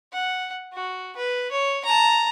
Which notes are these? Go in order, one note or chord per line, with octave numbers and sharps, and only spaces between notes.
F#5
F#4
B4
C#5
A5 A#5